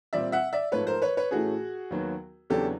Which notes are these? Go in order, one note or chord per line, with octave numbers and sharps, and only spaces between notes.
A#2 G3 C4 D5 E5
E5 F#5
D5 E5
G#2 F3 A3 B4 C#5
A#4 C5
B4 C#5
B4 C#5
A2 E3 A3 C#4 F#4 G#4
D#2 D#3 F#3 B3
E2 C#3 F#3 B3 D4 G4 A4